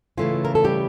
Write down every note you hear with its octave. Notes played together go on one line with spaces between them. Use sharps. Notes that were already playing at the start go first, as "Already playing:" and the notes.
C#3 E3 A3 C#4 F4
A#4
A4
G3 G4